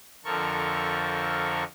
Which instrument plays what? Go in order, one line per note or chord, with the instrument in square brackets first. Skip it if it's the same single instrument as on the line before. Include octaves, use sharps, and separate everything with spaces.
[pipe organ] F2 D3 F3 A4 A#4 C#6